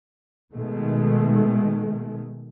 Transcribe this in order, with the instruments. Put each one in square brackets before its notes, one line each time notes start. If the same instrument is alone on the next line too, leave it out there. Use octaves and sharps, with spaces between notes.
[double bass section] B2 D#3 G#3 A3